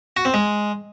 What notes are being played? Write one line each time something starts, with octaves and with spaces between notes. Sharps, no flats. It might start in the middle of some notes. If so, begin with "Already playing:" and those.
F#4
C4
G#3